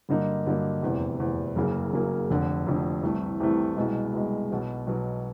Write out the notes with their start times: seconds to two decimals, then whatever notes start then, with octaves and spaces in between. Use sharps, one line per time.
0.09 G2 D3 F#3 A#3 D#4
0.46 G2 D3 F#3 A#3 D#4
0.82 F1 E2 C3
1.19 F1 E2 C3
1.56 F#1 F#2 C#3 F#3 A#3
1.92 F#1 F#2 C#3 F#3 A#3
2.30 F1 F2 D3
2.66 F1 F2 D3
3.03 C2 C3 E3 A3
3.40 C2 C3 E3 A3
3.77 C2 B2 G#3
4.13 C2 B2 G#3
4.50 B1 B2 F#3
4.87 B1 B2 F#3